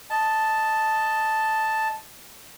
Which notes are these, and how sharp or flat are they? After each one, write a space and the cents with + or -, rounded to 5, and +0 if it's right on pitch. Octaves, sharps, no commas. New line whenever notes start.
D#5 +0 A5 +0